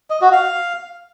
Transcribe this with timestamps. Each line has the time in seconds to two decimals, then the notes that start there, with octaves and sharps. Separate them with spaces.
0.10 D#5
0.21 F#4
0.32 F5